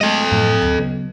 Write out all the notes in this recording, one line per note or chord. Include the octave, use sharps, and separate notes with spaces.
G#3 A3 A4 D#5
F#2 A2 F3
D2 A5
C#3 F#3 B3